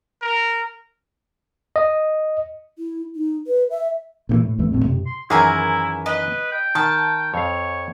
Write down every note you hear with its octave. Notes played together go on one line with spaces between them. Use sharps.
A#4
D#5
E4
D#4
B4
E5
A#2 C#3 E3
A2
G#1 E2 E3 A3
G#1 A2 A3 C4
F#2 C3
C6
F#2 D#3 E3 E4 G#4 G#5 A#5
B4 D#5
G5
D#3 A5
F2 C#5 F5